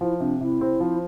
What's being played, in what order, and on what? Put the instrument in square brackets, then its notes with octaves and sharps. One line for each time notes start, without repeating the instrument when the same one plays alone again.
[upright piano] F3 [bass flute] E4
[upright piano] C3 [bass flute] D4
[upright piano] C3 [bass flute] E4
[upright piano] C4
F3